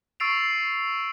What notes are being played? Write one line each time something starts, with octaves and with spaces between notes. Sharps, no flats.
C#6 E6 A6 C7 D7 F7